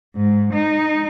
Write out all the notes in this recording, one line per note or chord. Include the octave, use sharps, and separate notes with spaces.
G#2
D#4